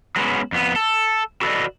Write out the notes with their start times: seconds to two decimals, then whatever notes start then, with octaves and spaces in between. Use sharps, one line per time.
0.16 F#3 G#3 B3 C#4 F#4
0.52 F2 B3
0.76 A4
1.41 F#4 A4 B4 C5 D5 D#5